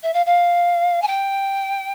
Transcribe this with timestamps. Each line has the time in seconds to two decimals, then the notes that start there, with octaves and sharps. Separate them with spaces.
0.03 E5
0.13 F5
0.26 F5
1.02 G#5
1.07 G5